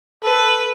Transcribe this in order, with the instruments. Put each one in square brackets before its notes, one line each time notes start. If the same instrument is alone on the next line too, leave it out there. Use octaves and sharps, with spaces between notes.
[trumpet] A4 [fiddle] B4